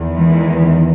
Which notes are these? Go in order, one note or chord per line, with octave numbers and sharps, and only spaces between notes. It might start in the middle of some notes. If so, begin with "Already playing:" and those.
Already playing: E2 D#3
E3 G#3